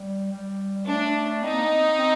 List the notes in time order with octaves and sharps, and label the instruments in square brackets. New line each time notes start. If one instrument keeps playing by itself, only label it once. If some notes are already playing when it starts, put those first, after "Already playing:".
Already playing: [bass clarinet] G3
G3
G3
[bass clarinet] A3 [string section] D4
[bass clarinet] C4 [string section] D#4
[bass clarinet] A#3
C4
C4